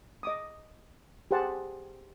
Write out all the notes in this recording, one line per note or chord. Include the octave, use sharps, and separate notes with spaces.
D#5 D6 D#6
G4 G#4 C5 F#5 A5